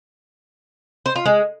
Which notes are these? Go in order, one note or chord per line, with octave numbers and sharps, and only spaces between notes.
C5
F4
G#3